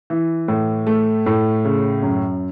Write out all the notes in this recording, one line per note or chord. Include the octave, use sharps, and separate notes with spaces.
E3
A2
A3
A2
C#3
F#2